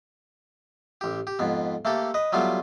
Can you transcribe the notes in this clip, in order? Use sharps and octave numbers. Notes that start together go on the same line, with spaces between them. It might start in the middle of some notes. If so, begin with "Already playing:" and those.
A1 G4
G4
F2 G#2 B3
A3 A#3 G4 A4
B4 D#5
F#3 G3 A3 B3 F4